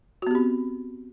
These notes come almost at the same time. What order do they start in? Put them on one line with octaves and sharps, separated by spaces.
F#4 B3 G4 C4